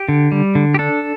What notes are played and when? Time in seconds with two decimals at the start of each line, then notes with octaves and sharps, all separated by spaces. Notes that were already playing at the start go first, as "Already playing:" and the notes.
Already playing: G4
0.09 D3
0.32 G3
0.55 D3
0.74 G4
0.79 D4 A4